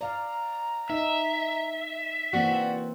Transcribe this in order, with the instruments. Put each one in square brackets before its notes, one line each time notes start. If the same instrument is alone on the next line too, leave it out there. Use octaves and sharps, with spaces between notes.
[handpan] D5 F5 [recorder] A#5
[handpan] D#4 [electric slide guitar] E5
[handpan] E3 A#3 C4 [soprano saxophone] F#4 [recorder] D5